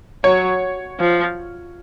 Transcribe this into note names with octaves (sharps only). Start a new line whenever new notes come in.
F#3 C#5
F3